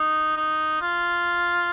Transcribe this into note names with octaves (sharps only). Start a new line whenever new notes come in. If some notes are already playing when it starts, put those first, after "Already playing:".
Already playing: D#4
D#4
F4